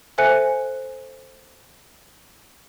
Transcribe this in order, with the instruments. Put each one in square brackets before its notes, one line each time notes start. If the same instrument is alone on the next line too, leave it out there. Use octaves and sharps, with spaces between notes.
[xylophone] A4 C5 E5 G#5 F#6 C#7